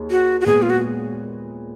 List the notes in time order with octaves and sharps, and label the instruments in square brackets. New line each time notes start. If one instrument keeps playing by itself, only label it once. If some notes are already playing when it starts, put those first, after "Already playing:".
Already playing: [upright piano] D#2 G#4
[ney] F#4
F#4
[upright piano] A#2 G#3 B3 [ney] G#4
[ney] F4
F#4